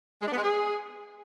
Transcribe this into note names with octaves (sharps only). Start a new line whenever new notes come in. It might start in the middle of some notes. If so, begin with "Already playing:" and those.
G#3
D4
B3
G#3
G#4